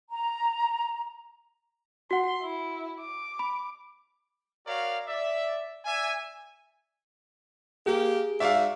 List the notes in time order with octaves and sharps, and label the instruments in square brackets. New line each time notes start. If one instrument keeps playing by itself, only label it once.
[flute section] A#5
[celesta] F#4 F#5 [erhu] C6
[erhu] E4
D6
[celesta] B5
[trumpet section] F#4 A#4 C#5 D5 F5
D5 E5
D5 E5 G#5
[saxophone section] A#3 G4 [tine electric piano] G#4
[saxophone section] G#2 F#4 D5 [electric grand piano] E5 F5